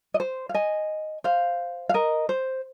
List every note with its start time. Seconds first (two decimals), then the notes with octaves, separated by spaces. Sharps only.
0.14 D#5
0.20 C5
0.49 F5
0.54 D#5 G#5
1.24 C5 F5
1.89 F5
1.94 A#4 D#5
2.29 C5